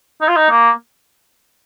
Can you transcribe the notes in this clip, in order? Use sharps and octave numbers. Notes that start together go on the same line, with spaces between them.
D#4
F4
D#4
A#3